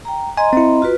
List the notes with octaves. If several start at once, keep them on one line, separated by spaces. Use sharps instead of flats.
G5 A#5
D#5 G#5 A#5 C6
C4 E4
F4 F#4 B4